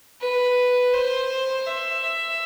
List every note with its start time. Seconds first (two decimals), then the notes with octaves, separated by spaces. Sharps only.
0.21 B4
0.93 C5
1.67 E5
2.03 E5